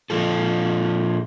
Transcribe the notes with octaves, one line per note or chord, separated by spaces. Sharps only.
A#2 F3 F4 A4